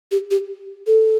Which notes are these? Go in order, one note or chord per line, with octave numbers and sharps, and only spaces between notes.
G4
G4
A4